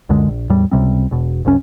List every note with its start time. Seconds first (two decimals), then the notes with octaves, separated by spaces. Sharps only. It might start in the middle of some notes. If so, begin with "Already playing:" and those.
0.09 C#2 F#2 D3 G#3
0.28 A#1
0.50 E2 A2 G3
0.71 C#2 C3 G3 C4
1.11 E1 B2
1.45 F#1 C2 F#2 C#4